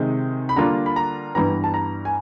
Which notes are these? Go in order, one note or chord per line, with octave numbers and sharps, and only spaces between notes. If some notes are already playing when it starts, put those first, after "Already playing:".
Already playing: C3 D#3 G#3
B5
D3 G3 A#3 D4 F4 A#5
B5
A#5
G2 E3 G3 B3 A#5
A5
A#5
G#5